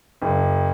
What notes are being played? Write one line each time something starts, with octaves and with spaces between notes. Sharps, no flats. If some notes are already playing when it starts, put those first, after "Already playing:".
F#1